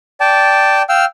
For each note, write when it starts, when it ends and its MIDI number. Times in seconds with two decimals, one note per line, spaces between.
0.20 0.82 74
0.20 0.82 79
0.20 0.82 81
0.89 1.05 77
0.89 1.05 79
0.89 1.05 88
0.89 1.05 89